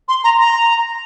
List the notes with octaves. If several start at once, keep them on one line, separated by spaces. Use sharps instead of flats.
C6
A#5
A#5